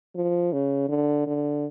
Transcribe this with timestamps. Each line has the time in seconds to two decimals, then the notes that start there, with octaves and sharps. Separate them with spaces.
0.15 F3
0.53 C#3
0.89 D3
1.27 D3